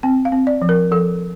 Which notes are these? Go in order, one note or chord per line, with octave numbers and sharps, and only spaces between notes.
C4 G5
F5
C4
D5
F3
A#4
F3 A4